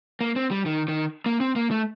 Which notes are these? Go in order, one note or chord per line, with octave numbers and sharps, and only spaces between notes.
A#3
C4
G3
D#3
D#3
A#3
C4
A#3
A3